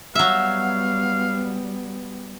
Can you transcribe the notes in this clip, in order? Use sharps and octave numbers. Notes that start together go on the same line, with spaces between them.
F#3 G3 B3 E5 F5